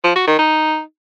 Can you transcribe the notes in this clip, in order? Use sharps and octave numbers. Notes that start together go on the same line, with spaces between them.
F3
F#4
D#3
D#4